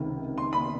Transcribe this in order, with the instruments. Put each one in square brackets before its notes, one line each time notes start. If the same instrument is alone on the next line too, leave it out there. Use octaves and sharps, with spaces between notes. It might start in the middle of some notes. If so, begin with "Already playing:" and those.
Already playing: [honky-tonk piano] C#2 C3 D#3
[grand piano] C6
B5